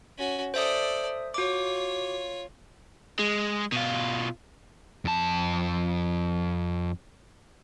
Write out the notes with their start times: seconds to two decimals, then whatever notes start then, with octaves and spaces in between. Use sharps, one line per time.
0.18 C#4 F#4
0.54 A4 C5 D5 E5 D#6
1.34 F4 F#4 C#5 D6
3.19 G#3
3.72 B2 F4
5.05 F2 A5